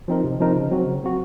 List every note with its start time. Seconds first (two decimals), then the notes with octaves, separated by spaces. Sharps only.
0.08 F3 C4 D#4 A#4
0.24 C3
0.40 F3 C4 D#4 A#4
0.56 C#3
0.71 F#3 C4 F#4
0.87 C#3
1.03 F#3 C4 F#4